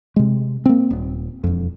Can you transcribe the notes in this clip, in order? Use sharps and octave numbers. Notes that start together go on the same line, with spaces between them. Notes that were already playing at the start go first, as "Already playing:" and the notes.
C3 G#3
A#3 C4
D#1
E1 F2